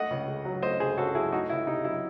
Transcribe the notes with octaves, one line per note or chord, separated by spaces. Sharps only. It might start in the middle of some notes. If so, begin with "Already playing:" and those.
Already playing: A3 D#5 F#5
C#2
C#3
F#3
A3 C5 D#5
C#2 G#4 C5
C#3 F#4 A4
F#3 E4 G#4
A3 D#4 F#4
C#2 E4
C3 D#4
F#3 E4